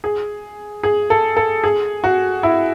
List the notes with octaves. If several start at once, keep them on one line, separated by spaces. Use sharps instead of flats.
G#4
G#4
A4
A4
G#4
F#4
E4